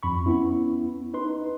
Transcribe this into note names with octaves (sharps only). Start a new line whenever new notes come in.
F2 B5 C#6
B3 C#4 E4
D#4 B4 C6